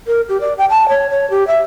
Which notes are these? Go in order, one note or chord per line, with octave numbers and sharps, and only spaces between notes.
A#4
G4
D5
G5
A5
C#5
C#5
G4
E5